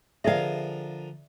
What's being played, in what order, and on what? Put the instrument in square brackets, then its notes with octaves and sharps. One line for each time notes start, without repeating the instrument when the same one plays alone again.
[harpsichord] D3 F3 A#4 [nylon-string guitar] G#4 F5 [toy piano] D5 E5